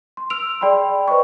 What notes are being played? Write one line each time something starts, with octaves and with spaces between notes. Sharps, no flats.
C6
E6 F6 D7 F7
G#4 D5 G5 B5 C6
B4 C5 D5 D#5 C#6